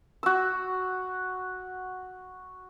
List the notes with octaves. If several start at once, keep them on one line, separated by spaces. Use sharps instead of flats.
F#4 E6